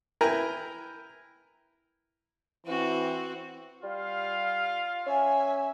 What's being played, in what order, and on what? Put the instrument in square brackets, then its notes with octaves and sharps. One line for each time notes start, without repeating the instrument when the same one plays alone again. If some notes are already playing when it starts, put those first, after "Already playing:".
[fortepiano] E4 A#4 B4 G5 G#5 A#5
[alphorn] E3 [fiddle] C4 F#4
[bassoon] G3 [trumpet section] F4 F5
[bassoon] C#4 [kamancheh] E5 G#5